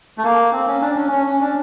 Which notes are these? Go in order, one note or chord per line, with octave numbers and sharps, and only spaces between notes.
A3
A#3
C4
C#4
D4
C#4
C#4
C#4
D4